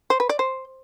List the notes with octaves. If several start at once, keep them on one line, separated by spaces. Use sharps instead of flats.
C5
B4
D5
C5